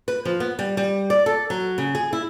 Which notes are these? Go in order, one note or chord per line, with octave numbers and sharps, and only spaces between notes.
B4
F3
B3
G3
G3
D5
A4
F#3
C#3
G#4
E4